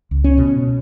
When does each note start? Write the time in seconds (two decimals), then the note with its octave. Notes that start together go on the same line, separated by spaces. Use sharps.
0.11 C#2
0.24 C#4
0.38 B2